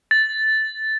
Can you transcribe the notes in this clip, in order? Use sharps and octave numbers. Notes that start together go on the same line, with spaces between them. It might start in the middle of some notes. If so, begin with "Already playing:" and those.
A6